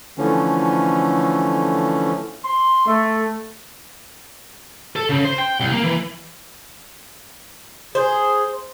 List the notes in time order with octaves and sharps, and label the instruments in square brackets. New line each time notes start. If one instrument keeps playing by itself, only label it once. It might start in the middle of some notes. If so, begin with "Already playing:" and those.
[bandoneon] D3 E3 F3 A3 C#4
[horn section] C6
A3
[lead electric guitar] A4
C#3
C5
G5
C2
A#3
E3
[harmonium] G#4 [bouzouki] C5